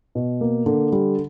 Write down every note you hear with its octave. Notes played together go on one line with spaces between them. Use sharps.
B2
A#3
D3
G3